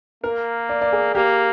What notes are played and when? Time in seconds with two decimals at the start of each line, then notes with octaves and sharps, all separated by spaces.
0.23 A#3 A#4
0.69 D5
0.81 D5
0.93 G#4
1.15 A#3 G4